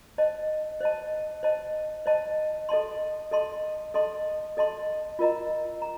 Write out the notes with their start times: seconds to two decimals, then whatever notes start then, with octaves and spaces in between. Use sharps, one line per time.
0.18 C5 D#5 A5
0.80 C5 D#5 A5
1.43 C5 D#5 A5
2.06 C5 D#5 A5
2.69 A4 D#5 A5 C6
3.32 A4 D#5 A5 C6
3.94 A4 D#5 A5 C6
4.57 A4 D#5 A5 C6
5.19 F4 A#4 D#5 A#5
5.82 A#5